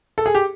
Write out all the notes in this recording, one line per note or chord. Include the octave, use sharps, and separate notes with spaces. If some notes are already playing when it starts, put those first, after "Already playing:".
A4
G#4
G4